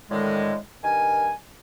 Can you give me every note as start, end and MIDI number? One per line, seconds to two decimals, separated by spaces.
0.10 0.56 45
0.10 0.56 50
0.10 0.56 51
0.10 0.56 56
0.83 1.31 43
0.83 1.31 51
0.83 1.31 70
0.83 1.31 80